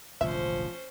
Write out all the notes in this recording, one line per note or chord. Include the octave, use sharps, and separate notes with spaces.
E1 A1 D3 F3 C#4 C5 E5